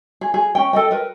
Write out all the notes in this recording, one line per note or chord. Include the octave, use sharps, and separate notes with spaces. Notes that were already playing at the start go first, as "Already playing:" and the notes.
G#4
G#4
C#4 G5
A4 D#5 G5
A#4 B4